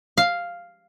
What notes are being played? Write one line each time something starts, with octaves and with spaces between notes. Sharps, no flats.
F5